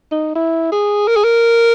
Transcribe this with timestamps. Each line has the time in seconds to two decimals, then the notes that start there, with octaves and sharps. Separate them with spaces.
0.12 D#4
0.35 E4
0.72 G#4
1.08 A#4
1.16 G#4
1.24 A#4